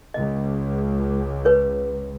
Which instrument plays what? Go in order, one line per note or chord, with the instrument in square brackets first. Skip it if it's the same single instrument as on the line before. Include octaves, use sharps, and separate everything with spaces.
[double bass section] C#2 [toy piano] D#5
[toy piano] B4 C#5